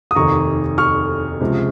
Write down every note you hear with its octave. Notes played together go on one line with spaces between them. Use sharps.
D#6
F1 D#2 D#3 A#5 C#6
C#6 F6
C#2 C3 F3 G#3